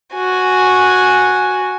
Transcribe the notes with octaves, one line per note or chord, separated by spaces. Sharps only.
F#4 G#5